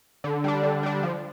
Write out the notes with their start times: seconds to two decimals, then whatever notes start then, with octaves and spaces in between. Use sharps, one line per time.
0.24 D3
0.44 G3 D4
0.63 D3
0.83 G3 D4
1.03 F3